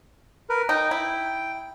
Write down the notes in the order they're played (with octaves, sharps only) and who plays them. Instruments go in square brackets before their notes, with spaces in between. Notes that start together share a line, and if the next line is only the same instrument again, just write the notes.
[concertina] A#4 B4
[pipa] D#4 [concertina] G5
[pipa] E4